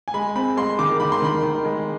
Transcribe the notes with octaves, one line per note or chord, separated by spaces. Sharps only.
G#5
G#3 B5
C4 B5
G#3 C6
D#3 D6
D#3 B5
C6
D#3 B5
D#3
G#3